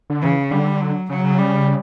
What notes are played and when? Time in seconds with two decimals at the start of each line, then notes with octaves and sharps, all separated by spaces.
0.10 D3
0.22 C#3 E3
0.51 D3 G3
0.80 F#3
1.09 C#3 F#3
1.24 C#3
1.38 G3